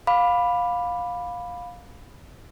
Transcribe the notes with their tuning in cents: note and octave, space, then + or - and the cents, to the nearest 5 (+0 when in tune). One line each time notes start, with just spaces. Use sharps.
F5 +20 B5 +0 D6 +0